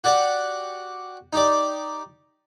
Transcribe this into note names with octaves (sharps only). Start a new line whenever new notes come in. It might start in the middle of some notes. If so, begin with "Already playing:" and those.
F#4 G4 D5 F#5
D#4 G4 D5